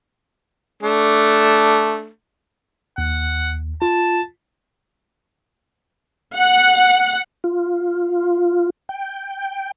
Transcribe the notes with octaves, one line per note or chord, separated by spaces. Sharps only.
A3 D4
D#2 F#5
F4 A5
F#5
F4
G5